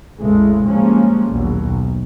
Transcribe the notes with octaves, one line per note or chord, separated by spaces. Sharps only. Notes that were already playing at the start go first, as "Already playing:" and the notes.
A1 E2 C#3 E3 G#3 A3
C#3 F3 G3 G#3 A#3 C#4
A#1 D#2 B2 F#3
B1